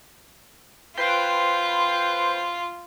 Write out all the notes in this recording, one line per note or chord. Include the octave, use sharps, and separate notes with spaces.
F4 B4 C5 G5